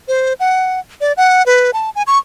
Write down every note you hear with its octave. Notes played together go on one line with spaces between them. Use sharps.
C5
F#5
D5
F#5
B4
A5
G#5
C#6